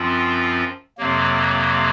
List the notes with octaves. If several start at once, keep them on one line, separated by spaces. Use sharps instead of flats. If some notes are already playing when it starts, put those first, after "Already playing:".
Already playing: F#2 F3 C4 F4
F2 C3 F#3 A#3